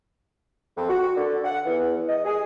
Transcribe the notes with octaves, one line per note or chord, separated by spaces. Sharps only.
F2
F#4
D3
F#5
E2
D#5
G#4